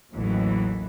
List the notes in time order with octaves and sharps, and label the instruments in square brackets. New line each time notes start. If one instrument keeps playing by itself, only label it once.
[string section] A1 D#2 E3 F#3